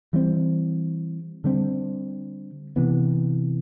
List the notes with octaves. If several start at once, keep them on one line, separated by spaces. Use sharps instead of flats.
E3 G3 C4
D3 G3 C4
C3 E3 B3